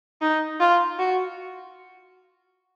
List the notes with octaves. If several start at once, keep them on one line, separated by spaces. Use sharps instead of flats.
D#4
F4
F#4